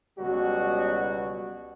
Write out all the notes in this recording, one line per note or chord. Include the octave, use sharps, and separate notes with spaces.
C#2 B2 F#3 G3 F#4